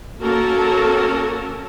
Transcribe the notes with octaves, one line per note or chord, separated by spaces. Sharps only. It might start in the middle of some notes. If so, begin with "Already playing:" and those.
A#3 C#4 F#4 A4 A#4 A5